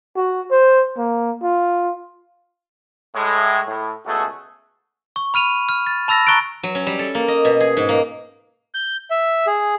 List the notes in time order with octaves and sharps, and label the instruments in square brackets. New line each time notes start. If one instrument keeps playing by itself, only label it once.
[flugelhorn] F#4
C5
A#3
F4
[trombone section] A2 G#3
A2
C#2 B2 A3 F#4 G#4 A4
[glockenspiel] C#6
B5 F6 D#7 F7
F6
A6
A5 B5 E6 A6 A#6
A#5 C#6 F#6 A6 D7
[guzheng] F#3
C#4
G3
A4
A#3
D#5
B2
G#4
G#2
A#3
[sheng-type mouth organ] G6
E5
G#4